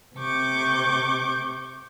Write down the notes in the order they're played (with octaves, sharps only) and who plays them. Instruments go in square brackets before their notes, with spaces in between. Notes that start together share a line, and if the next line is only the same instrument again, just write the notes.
[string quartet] C3 C#6 D6 G6